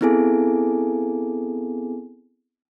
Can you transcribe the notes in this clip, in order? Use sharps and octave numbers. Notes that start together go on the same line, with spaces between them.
B3 C4 E4 G#4 A4 G#5